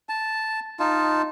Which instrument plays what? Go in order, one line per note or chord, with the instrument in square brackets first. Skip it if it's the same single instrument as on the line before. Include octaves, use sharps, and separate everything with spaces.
[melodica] A5
D#4 F4 A5